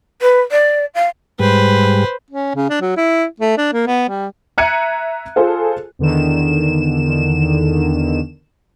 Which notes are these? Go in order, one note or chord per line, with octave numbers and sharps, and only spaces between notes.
B4
D5
F5
G#2 G3 B4 C5
C#4
C#3
D4
F#3
E4
A3
D4
A#3
B3
G3
E5 A#5 F#6 G#6 C#7 D#7
F4 G#4 A4 C5
E2 D3 D#3 E7